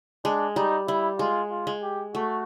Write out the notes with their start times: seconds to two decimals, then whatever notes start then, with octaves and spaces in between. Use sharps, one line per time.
0.25 G#3 D4
0.56 G3 D#4
0.87 G3 E4
1.19 G#3 F4
1.51 F4
1.67 G#3
1.83 G4
2.14 A3 F#4